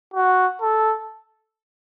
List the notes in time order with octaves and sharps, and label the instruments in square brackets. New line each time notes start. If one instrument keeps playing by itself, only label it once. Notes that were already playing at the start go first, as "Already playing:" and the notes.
[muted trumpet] F#4
A4